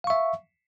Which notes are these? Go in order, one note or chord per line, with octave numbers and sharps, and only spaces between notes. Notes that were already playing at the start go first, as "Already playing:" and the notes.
E5 F5 C#6